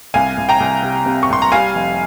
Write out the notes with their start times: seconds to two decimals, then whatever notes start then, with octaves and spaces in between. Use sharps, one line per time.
0.14 C2 F5 G#5
0.38 C2
0.49 G5 A#5
0.60 C2
0.83 C3
1.06 C3
1.23 C#6
1.30 C2 C6
1.42 A#5
1.52 G3 F5 G#5
1.75 F1